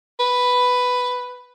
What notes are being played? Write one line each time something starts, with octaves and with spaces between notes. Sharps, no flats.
B4